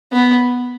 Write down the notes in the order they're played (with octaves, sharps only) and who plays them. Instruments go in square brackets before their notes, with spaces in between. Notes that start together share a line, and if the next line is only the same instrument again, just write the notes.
[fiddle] B3